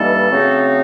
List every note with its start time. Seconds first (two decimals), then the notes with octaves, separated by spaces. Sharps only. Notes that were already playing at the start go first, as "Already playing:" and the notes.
Already playing: G2 E3 G3 A#3 D#4 A4
0.31 C#3 F#3 A3 C4 D#4